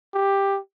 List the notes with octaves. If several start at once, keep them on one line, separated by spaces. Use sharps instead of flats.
G4